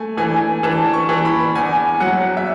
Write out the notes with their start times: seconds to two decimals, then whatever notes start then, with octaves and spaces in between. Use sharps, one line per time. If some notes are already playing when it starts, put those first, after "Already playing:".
Already playing: A3 G#5
0.17 E3 G#5
0.63 E3 A5
0.94 C#6
1.09 E3
1.25 B5
1.55 E2 G#5
2.00 F#3 F#5
2.37 E5